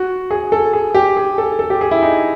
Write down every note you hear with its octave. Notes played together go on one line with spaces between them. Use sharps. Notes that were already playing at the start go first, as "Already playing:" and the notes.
Already playing: F#4
G#4
A4
G#4
G4
G#4
A4
A4
G4
G#4
E4
D#4